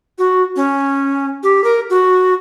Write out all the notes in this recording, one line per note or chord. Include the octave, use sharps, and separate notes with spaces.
F#4
C#4
G4
A#4
F#4